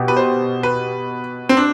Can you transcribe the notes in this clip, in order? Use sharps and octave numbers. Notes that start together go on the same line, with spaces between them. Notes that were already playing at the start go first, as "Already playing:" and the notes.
Already playing: B2 G4
B4
C5
B4
C4
D4